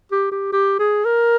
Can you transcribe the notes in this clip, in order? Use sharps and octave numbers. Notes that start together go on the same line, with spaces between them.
G4
G4
G4
G#4
A#4